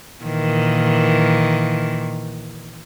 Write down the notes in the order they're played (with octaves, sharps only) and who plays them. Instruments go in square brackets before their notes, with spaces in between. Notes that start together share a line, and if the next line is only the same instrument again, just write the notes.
[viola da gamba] A#2 D#3 E3